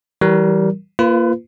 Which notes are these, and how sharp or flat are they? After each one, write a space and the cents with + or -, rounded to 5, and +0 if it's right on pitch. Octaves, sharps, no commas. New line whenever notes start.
E3 -5 G3 -25 A#4 +0
A#3 +0 F4 -25 B4 +25